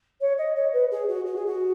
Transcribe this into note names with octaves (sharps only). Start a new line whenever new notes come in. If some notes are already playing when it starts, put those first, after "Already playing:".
C#5
D#5
C#5
B4
G#4
F#4
F#4
G#4
F#4